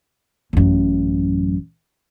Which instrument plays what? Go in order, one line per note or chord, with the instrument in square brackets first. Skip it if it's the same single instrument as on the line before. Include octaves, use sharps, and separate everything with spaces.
[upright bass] A1 F#2